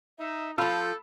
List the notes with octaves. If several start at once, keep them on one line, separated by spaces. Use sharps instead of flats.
D#4 E5
F3 F4 A4 B5 E6 G6